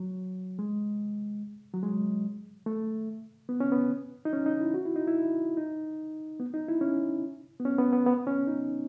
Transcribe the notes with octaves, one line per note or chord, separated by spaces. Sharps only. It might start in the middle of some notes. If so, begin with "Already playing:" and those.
Already playing: F#3
G#3
F#3
G#3
A3
B3
C#4
B3
D#4
C#4
D#4
E4
F#4
E4
D#4
E4
D#4
B3
D#4
E4
C#4
B3
C#4
B3
B3
B3
C#4
D#4